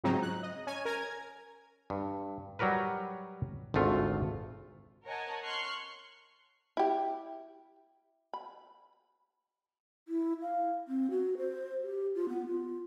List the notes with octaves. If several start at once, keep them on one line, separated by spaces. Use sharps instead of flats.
G#2 C#3 F3 F#3 C4 D#4
F#6
D#5
C#4 G#5
A#4 G#5 A#5 G#6
G2
F#3 G3 F#4 A#4 B4
G#1 D2 A3 F4
A#4 C#5 D#5 F#5 G#5 A5
C6 C#6 F6 F#6 C7
E4 G4
B5
E4
F5
C4
F#4
C5
G4
F4
B3
F4